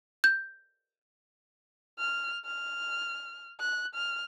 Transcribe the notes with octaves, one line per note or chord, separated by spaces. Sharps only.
G6
F6
F6
F#6
F6